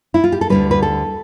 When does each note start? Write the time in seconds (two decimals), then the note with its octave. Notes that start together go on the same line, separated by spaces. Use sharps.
0.14 E4
0.24 F4
0.32 G4
0.41 A4
0.50 D2 D3 G3 B4
0.71 B4
0.83 A4